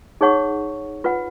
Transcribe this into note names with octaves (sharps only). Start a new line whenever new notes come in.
D#4 G#4 C#5 F#5 C#6
F4 B4 F#5